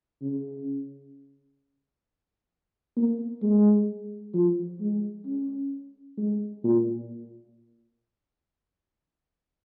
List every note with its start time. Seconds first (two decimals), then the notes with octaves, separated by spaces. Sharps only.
0.22 C#3
2.97 A#3
3.43 G#3
4.34 F3
4.80 G#3
5.26 C#4
6.17 G#3
6.64 A#2